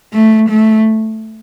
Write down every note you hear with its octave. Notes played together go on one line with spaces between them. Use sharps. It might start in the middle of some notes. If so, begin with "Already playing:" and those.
A3
A3